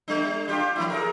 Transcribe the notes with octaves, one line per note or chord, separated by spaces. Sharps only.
G3 D4
D4 F4 G4
F3 A#3 E4
G#4 A#4